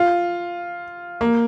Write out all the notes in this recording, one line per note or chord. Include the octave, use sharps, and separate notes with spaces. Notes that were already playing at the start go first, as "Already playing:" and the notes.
Already playing: F4
A#3